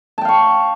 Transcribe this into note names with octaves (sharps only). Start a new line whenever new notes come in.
F5 G5 A5 C#6